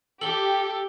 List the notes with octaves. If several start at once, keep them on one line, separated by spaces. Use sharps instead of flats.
G4 A4 F#7 G7